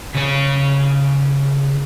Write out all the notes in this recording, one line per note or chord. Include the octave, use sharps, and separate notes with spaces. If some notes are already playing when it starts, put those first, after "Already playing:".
C#3 C#5